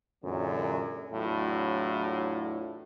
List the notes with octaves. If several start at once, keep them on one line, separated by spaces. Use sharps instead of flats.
F#2 A#2 D3 E3 F#3 G#3
E2 A2 F#3 D4 E4 F4